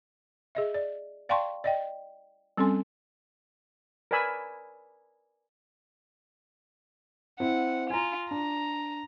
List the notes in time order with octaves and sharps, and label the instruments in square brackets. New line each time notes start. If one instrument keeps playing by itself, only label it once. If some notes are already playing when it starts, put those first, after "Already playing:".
[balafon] G#4 D#5 E5
D5
D5 F5 G5 A5 C6 C#6
D5 D#5 G5
G3 C4 C#4 A4 G#5 C6
[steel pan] A#4 B4 D5 G#5 B5 E6
[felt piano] C4 E4 [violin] F#5
[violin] F4 [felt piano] G#5 A#5
[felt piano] D4 [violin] A#5